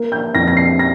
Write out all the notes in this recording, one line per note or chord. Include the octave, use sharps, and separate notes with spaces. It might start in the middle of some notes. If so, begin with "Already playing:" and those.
Already playing: A#3
G6
F2 A#6
A#6
C7
A#6